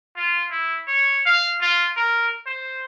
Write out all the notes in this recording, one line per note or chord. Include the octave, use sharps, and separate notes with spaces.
F4
E4
C#5
F5
F4
A#4
C5